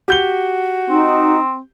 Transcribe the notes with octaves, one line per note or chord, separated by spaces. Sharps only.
F#4 G4 G6 G7
C4 D#4